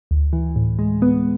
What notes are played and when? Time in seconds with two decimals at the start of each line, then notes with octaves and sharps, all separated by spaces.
0.11 D2
0.33 E3
0.56 A2
0.79 G#3
1.02 B3